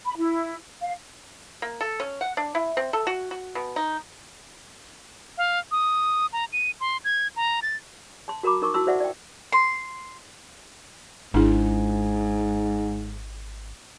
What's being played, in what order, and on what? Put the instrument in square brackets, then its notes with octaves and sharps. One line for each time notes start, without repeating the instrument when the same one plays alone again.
[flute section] B5
E4
F5
[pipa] A#3
A4
C#4
F#5
D4
E4
C4
A4
F#4
F#4
B2
D#4
[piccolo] F5
D#6
A#5
D#7
C6
G#6
A#5
A6
[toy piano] A5 C6
F#4 A#4 A#5 B5 D6
D#4 A#4 C#6 D6
E4 F#4 A5 C6 E6
E4 F#4 C5 D5 E5 F#5
D5 G5
[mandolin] C6
[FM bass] G#1 [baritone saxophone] G#2 [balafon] D4 E4 G#4